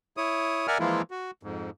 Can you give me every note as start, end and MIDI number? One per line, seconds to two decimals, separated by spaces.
0.17 0.67 64
0.17 0.67 73
0.17 0.67 87
0.67 0.78 70
0.67 0.78 74
0.67 0.78 76
0.67 0.78 78
0.67 0.78 80
0.67 0.78 89
0.80 1.02 52
0.80 1.02 53
0.80 1.02 56
0.80 1.02 58
0.80 1.02 64
0.80 1.02 65
1.11 1.31 66
1.43 1.70 41
1.43 1.70 44